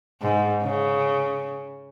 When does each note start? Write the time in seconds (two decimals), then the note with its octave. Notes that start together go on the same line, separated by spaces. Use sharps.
0.22 G#2
0.62 C#3